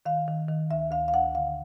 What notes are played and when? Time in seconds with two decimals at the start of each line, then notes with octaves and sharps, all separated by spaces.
0.06 D#3 F5
0.28 D#3
0.49 D#3
0.71 D2 E5
0.91 D2 F5
1.08 F5
1.14 D2 F#5
1.35 D3 F5